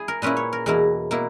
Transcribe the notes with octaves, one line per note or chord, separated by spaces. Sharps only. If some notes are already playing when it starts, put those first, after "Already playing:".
Already playing: E4 G#4
A#4
A#2 A#3 C#4 E4 B4
C#5
A#4
E2 B2 A#3 E4 A#4
B2 A#3 E4